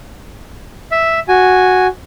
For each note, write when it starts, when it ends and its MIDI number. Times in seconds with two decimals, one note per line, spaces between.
0.92 1.20 76
1.28 1.87 66
1.28 1.87 80